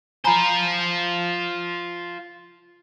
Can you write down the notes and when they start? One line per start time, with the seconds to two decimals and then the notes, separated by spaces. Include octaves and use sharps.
0.24 F4 C5 G#5 A#5 B5